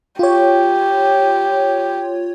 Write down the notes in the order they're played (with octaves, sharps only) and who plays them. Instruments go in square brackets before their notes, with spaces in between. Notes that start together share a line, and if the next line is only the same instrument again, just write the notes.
[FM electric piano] F4 C#5 [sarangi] G4